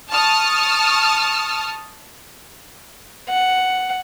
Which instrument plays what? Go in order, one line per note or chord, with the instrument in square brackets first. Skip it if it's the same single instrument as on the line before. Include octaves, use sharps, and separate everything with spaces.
[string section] A5 C#6 D#6 F6
[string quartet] F#5